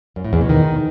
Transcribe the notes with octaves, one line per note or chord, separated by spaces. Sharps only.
F#2
A2
E2
B2
D#3